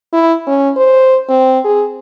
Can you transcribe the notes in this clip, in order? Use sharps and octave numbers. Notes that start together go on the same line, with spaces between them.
E4
C#4
C5
C4
G#4